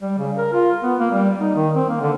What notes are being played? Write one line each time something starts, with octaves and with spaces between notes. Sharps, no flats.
G3
C#3
A#4
F4
B3
A#3
G3
D#4
D#3
C4
A#3
D3